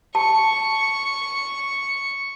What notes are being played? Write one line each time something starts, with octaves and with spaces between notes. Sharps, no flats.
A5 C#6